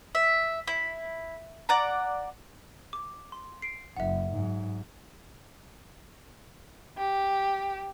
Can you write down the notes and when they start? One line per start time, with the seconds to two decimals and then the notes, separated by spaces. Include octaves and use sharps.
0.15 E5
0.68 E4
1.69 D5 F#5 A#5
2.93 D6
3.32 C6
3.62 C7 D7
3.97 F#1 E5 F#5
4.33 G#2 F#3
6.98 G4